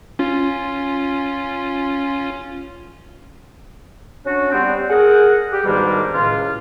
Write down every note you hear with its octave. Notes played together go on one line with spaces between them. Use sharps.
C#4 F4
C#4 D4 F#4
G3 B3 C4
G#4 A#4 F#5
G4
G#2 B2 D#3 G3 A#3 D4
C#2 A2 F4